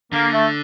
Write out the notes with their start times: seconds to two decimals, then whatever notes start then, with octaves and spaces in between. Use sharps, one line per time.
0.12 D3 A#3
0.32 A3